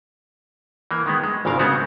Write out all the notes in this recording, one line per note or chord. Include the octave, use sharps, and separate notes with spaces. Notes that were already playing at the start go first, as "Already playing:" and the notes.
E3 A#3
D#3 G#3 B3
G#3
G#1 A#2 C#3 A#4 F5
C#3 G#3 B3 C4 F#4